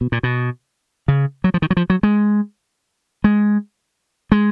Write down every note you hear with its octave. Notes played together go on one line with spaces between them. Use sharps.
B2
A#2
B2
C#3
F#3
F3
D#3
F#3
F3
F#3
G#3
G#3
G#3